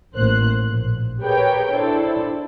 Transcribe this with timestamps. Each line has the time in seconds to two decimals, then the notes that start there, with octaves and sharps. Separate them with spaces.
0.15 A1 A#3 C5 F#6
0.64 A#1
1.21 G4 G#4 A#4 B4 C#5 G5
1.73 D4 E4 A4 C5